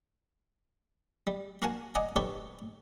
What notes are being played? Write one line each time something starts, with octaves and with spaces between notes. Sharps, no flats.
G3
A#3 F#4 A#4 F#5 G#5 A5
D5 D#5 F#5 G#5 A#5 D6
G4 A4 B4 C#5 D5 A5